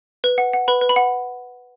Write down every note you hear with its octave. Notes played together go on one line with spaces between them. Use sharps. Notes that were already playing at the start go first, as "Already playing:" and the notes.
B4
F#5
F#5
B4 B5
B4
B5
F#5